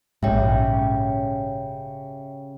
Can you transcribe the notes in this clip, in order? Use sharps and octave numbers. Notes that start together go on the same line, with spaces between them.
A#1 G#2 C#3 C#4 G4 E5 G5